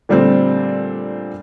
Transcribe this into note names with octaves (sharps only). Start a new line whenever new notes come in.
A#2 D3 G3 A3 C4